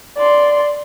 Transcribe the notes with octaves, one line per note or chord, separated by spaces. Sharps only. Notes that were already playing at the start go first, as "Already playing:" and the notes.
D5 C6